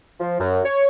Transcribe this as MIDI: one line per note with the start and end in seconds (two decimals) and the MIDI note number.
0.19 0.34 53
0.39 0.60 42
0.64 0.88 73